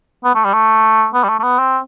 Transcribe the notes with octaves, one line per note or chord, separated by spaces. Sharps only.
B3
A3
G3
A3
B3
G3
A3
A3
B3
C4